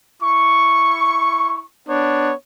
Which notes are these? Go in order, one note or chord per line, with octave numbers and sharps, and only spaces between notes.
E4 C#6
B3 D4 C#5